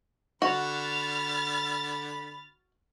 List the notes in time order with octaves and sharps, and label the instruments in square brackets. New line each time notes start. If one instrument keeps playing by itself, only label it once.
[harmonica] D3 B5 [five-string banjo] F#4 [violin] F6 A6